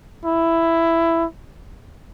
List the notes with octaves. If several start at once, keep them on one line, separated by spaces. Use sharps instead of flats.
E4